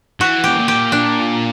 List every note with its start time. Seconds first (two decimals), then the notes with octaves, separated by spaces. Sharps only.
0.21 E3 F#4
0.44 B2 G4
0.56 A#2
0.68 G4
0.92 D4